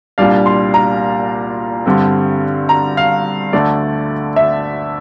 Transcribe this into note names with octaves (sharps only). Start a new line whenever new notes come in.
C2 A#2 G3 D4 F5
C6
A#5
G2 D3 G3 C4
A#5
F5
D2 D3 A3 D5
E5